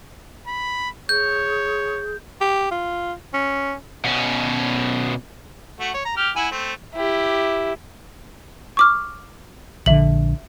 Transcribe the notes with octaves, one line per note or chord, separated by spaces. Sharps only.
B5
G#4 C#5 G6
G4
F4
C#4
B2 C#4
A3 F#4
C#5
A#5
G4 F6
E4 F#5 G#5
A3 C4
E4 G4
C#6 D6 F6
A#1 D3 E5 F#7